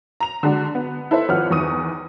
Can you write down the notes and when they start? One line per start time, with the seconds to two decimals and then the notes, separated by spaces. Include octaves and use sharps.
0.20 A#5 F7
0.43 D3 G#3 D4 F#4
0.75 B3
1.11 E4 A4 B4 C5 E5
1.29 G#1 F3 B4 C#5 F#5 F6
1.50 E2 D#3 C#6 D#6 D#7